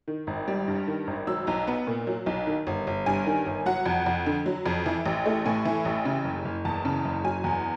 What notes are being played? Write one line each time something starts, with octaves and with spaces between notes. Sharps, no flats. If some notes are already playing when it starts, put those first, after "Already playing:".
D#3
G#1
G3
G2
D#3
G#1
F#3 E6
B1 A#5
B3
A#2
F#3
B1
D#3
G1
G1
G2 G#5
D#3
G1
F#3 F#5
F2
F2
D3
F#3
F2
E3
A1
A3
A2 G#5
E3
A1
C#3
F#1
F#1
E2 A5
C#3
F#1
F#3 G#5
E2